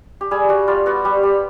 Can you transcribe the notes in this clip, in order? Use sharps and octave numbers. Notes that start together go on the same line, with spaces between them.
G4
G3 G#4
G3 F#4
G3 F4
B3 F#4
G3 G4
G3